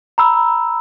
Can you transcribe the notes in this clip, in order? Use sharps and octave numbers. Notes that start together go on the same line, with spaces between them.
A#5 B5 E6